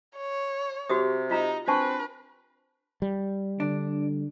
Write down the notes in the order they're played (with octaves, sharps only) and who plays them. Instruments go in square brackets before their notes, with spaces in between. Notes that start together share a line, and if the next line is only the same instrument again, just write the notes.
[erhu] C#5
[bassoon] C3 [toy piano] F#4 G4 D#6
[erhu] D#4 [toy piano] F4 A#5 E6
[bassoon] C4 [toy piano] D4 A5 C#6 [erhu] B4
[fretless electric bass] G3
[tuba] D3 [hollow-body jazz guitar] D4